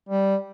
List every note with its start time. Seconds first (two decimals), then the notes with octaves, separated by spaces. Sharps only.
0.09 G3